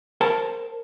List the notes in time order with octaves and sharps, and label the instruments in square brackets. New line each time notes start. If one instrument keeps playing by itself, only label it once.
[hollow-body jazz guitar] A#4 C5 A5